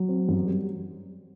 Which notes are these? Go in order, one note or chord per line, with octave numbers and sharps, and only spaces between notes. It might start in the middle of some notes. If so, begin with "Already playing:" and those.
Already playing: F#3
C4
F#2
G3